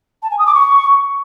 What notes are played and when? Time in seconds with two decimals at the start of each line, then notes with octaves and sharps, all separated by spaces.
0.23 A5
0.31 G#5
0.39 D#6
0.47 D6
0.55 C#6